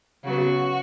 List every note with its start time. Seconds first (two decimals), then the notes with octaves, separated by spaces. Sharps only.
0.24 C#3 F#3 B3 F#4